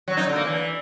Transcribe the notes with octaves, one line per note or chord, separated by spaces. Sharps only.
F#3
D#4
D3
A#3
E3